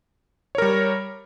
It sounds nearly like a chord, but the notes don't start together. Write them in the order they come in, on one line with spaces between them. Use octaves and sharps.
C#5 A#4 G3